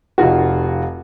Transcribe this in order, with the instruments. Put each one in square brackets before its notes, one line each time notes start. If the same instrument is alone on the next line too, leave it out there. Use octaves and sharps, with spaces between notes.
[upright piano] F1 D#4 F4 F#4